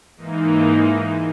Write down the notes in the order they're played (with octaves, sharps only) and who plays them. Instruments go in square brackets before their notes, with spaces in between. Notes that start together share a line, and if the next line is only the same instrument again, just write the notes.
[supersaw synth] G#2 E3 A#3 D#4